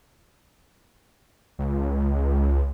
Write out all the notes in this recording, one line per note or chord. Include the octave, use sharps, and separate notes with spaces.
C#2